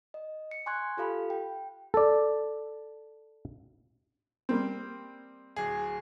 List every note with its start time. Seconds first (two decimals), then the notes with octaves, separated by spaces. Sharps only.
0.14 D#5
0.51 C#7
0.66 G#5 C6 C#6 F#6 G#6
0.97 F4 G4 A4 F5 B5
1.30 G5
1.94 A4 D5
4.49 G3 A#3 C4
5.56 D1 G#4